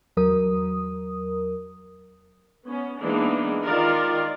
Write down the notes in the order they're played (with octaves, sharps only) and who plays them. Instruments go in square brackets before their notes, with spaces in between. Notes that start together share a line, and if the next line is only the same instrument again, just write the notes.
[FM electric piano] E2 F#3 A#4 D#6
[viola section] B3 C#4
E3 G#3 A#3 B3 D4 D#4
D#3 F4 A#4 D5